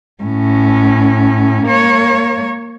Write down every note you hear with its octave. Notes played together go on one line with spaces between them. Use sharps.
A2 C#4
A#3 C#5